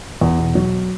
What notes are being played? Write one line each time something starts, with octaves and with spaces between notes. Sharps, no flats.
E2
B2
F#3